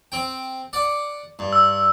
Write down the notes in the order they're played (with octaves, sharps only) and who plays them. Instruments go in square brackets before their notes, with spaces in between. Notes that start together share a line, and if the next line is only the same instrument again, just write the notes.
[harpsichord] C4 G5
D5 F#5
G2
[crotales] E6